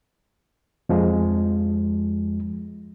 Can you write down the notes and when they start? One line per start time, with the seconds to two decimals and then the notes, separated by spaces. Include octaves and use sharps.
0.89 F2 F3 G#3